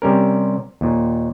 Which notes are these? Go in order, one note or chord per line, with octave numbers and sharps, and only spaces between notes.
C3 G3 C#4 A#4
D#2 A#2